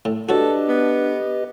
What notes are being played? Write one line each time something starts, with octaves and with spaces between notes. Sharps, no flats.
A2
D4 F#4 G4 A4 B4 C#5 D#5
B3